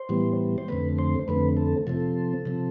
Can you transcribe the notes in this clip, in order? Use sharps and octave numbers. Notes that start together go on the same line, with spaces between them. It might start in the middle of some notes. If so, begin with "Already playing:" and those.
Already playing: C5
A2 E3 G3 B3
C5
F2 D3 A3 C4 B4
C5
F2 D3 A3 C4 B4
A4
C3 F3 C4 A4
C3 F3 C4